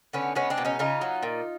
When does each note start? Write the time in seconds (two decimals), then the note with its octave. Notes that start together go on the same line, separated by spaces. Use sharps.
0.13 D3 B3 C#4
0.35 G#3 B3 C#4
0.50 C4 D4
0.58 B2
0.65 C#4 D#4
0.79 C#3 D#4 F4
1.01 F#3
1.23 A#2